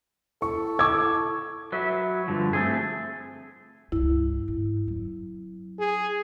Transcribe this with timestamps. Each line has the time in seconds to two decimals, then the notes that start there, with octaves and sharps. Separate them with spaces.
0.42 E4 A4 C#6
0.79 C#6 D6 E6 G#6
1.72 F#3 B4 E5
2.28 G2 D3 F3
2.53 A3 C4 G#4
3.92 C#2 G2 E4
4.48 G#2
4.87 F#3 C4
5.79 G#4